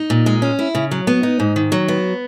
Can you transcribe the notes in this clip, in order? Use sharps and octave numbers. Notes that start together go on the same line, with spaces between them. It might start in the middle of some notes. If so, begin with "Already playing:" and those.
Already playing: D#4
A#2
G#3
C#4
E4
C#3
F#3
B3
D#4
G#2
D#3
F#3
B3